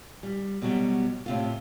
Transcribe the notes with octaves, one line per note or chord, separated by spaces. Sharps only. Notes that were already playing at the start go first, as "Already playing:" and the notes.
G3
B2 F#3 G3
A2 C3 F4